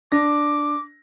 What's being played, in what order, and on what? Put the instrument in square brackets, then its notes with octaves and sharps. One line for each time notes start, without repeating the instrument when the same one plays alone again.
[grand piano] D4 A#6 [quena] D6